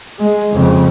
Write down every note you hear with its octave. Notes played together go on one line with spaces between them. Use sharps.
G#3
F2 C#3